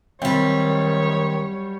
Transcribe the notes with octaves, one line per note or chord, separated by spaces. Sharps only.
F#2 D#3 G3 C4 C#5